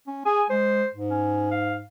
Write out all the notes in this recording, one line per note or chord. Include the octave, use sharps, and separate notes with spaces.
C#4
G#4 G#5
G#3 C5
G#2
C#4
F5